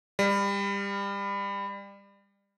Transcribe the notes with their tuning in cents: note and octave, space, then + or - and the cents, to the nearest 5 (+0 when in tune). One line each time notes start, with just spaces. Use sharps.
G3 +25